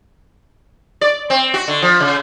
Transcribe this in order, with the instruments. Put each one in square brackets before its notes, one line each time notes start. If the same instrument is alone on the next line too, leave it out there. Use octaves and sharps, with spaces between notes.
[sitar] D5
C4
F#4
D3
F3
C#3